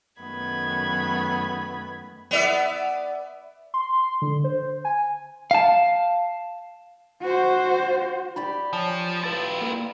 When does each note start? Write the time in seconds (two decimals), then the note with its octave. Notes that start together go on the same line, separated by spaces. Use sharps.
0.22 F#2 D#3 A3 B3 B5 G#6
2.31 B3 D5 E5
3.74 C6
4.22 D3
4.44 C5
4.85 G#5
5.51 F5 A5
7.22 F#4 C5
8.36 G4 D5 B5
8.73 F3 C#5 G#5 A5
9.24 E4 F4 B4 A6
9.61 A#3 A#4